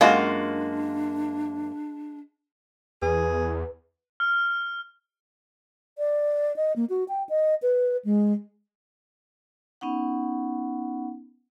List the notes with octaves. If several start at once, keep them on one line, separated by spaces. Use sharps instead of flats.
F#2 G#3 A#3 D4 F4 F#4
E2 G#4 B4
F6
D5
D#5
A#3
F#4
G5
D#5
B4
G#3
B3 C#4 D#4 F#5